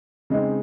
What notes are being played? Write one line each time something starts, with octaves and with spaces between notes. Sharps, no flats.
C#3 G#3 C4 D#4